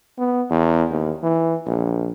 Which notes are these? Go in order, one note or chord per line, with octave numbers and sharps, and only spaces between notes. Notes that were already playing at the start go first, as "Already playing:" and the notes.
B3
E2
D#2
E3
A#1